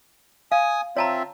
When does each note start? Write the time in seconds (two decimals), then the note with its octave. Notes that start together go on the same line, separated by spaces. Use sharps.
0.52 F5 G#5 D#6
0.97 C4 F4 C#5 E5 A5 A#5